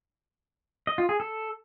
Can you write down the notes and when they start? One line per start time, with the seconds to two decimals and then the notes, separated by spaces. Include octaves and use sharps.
0.87 D#5
0.98 F4
1.09 G#4
1.20 A4